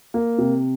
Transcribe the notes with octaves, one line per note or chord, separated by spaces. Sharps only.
A#3
C3